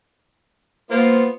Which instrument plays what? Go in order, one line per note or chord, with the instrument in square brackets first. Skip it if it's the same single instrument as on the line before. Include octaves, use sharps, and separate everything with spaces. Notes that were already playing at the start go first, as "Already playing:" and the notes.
[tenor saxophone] A#3 [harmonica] B3 F4 [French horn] C5